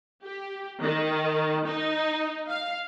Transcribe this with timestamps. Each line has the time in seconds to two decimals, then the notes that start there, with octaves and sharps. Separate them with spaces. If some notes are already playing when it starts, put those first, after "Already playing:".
0.23 G4
0.81 D#3
1.67 D#4
2.49 F5